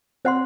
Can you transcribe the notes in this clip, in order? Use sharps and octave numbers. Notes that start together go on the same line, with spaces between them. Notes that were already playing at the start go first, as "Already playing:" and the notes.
C4 C5 F#5 C6